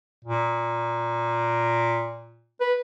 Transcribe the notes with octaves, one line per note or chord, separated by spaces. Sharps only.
A#2
B4